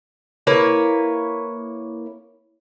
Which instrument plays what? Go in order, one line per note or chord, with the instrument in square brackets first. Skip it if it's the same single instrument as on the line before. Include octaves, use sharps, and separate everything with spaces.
[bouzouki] A#3 E4 B4 C#5